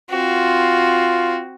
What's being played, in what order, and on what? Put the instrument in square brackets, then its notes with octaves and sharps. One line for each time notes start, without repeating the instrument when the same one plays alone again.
[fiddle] C4 F#4 [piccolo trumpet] F4